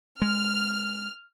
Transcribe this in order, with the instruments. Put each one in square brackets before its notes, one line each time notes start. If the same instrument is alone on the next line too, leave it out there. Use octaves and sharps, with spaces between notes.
[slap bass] G#3 [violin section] F6